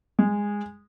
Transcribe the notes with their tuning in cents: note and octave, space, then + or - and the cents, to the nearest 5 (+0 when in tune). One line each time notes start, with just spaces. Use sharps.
G#3 -15